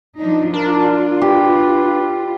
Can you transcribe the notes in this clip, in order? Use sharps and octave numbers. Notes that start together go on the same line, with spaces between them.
F3 D4 D#4
D4 F4 A#4
G4 B4